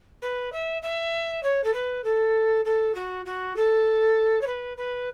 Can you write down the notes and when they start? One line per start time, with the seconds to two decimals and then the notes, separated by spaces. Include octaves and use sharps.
0.22 B4
0.52 E5
0.82 E5
1.43 C#5
1.63 A4
1.73 B4
2.04 A4
2.65 A4
2.94 F#4
3.25 F#4
3.56 A4
4.41 C#5
4.46 B4
4.77 B4